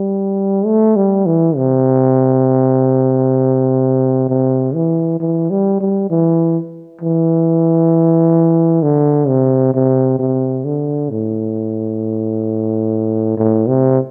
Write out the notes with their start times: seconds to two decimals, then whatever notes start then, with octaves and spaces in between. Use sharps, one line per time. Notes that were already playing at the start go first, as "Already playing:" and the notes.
Already playing: G3
0.66 A3
0.96 G3
1.26 E3
1.56 C3
4.29 C3
4.74 E3
5.20 E3
5.50 G3
5.81 G3
6.10 E3
7.01 E3
8.83 D3
9.28 C3
9.74 C3
10.19 C3
10.65 D3
11.10 A2
13.38 A2
13.67 C3